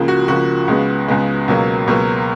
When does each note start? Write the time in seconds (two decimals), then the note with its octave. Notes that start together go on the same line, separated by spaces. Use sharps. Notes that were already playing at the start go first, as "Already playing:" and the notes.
Already playing: C#2 C#3 F3 A#3
0.08 F#4
0.28 C#2 C#3 F3 A#3 F#4
0.68 C#2 C#3 G#3 B3
1.08 C#2 C#3 G#3 B3
1.48 C#2 B2 F#3 A#3
1.87 C#2 B2 F#3 A#3